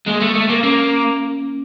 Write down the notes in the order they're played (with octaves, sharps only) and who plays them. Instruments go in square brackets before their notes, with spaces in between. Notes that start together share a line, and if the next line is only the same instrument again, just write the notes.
[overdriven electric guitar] G#3 [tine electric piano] A#3
[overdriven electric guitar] A3
A3
A#3
[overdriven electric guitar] A#3 [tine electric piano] C#4